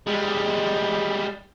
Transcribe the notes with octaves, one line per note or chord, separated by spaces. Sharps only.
G3 G#3